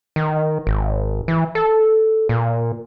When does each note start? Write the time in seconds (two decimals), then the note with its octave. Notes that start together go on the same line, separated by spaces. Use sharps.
0.16 D#3
0.67 G#1
1.28 E3
1.55 A4
2.29 A#2